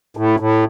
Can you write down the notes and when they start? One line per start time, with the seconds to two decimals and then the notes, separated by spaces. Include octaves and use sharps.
0.17 A2
0.40 A2